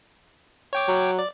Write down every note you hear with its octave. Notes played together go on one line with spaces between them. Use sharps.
C#5 G5 D6
F#3
D5